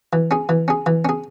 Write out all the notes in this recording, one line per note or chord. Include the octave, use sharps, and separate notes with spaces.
E3
C#4 G#4
E3
C#4 G#4
E3
C#4 G#4